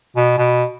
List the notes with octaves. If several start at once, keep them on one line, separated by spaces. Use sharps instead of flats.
B2
B2